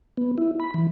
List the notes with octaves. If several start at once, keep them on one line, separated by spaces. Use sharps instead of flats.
B3
E4
B5
E3